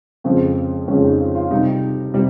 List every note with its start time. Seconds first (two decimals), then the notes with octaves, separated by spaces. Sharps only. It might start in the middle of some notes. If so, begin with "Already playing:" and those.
0.24 F2 C#3 F3 G#3 C4
0.88 F2 C#3 F3 G#3 C#4
1.04 D#4
1.19 F4
1.35 F4
1.51 C3 G3 D#4
2.14 C3 G3